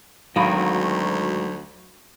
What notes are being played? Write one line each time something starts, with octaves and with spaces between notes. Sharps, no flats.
D2 G#2 D#3 F#3 A4 F5 B5